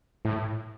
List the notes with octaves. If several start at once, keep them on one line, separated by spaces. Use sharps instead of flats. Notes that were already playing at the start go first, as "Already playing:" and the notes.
A2